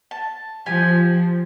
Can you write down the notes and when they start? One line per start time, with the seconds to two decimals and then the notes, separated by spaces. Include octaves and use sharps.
0.11 A5
0.66 F3 G4 G#5